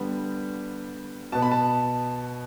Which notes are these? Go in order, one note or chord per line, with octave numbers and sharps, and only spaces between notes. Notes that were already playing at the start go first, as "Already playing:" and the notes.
Already playing: D3 G3 B3
B2 B3 A5
B5
A5